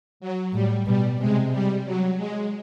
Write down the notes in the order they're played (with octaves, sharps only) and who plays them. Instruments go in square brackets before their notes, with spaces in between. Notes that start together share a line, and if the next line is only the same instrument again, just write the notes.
[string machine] F#3
[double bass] A2 [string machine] G3
[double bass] B2 [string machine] G3
[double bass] C3 [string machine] G#3
[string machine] G3
F#3
G#3